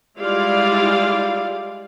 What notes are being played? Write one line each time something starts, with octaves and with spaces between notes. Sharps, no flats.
G3 G#3 E4 F4 D5 F5